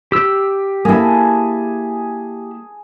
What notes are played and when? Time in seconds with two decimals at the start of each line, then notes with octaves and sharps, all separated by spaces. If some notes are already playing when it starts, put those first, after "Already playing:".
0.12 G4 E6
0.85 A#3 E4 G#4 A4